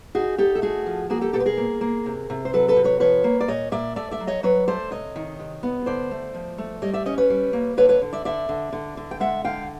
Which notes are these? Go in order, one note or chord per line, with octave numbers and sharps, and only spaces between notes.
D#4 F#4 G#4
D#4 G4 A4
A4
A3 F#4 G#4
F3
A#3 F#4 G#4
G4 A4
B2 G4 A4
B4
G#4 A#4
A#3
A#3
C3
C3
C5
F#3 A4 B4
A4 B4
C3
B4 C#5
F3 B4 C#5
A#3
D5
A#2 C#5 D#5
A#2 D5 E5
A3 D5 E5
D5 E5
F#3
C#5 D#5
F#3 B4 C#5
A3 C5 D5
C3 C#5 D#5
D#3
C3
B3
D3 C5 D5
A3
F3
A3
G3 C#5 D#5
D5 E5
C#4 C#5 D#5
B4 C#5
G3
A#3
D3 B4 C#5
B4 C#5
D3
D5 E5
D3 D5 E5
D3
D3
D3
G5
G#3 E5 F#5
D3 F5 G5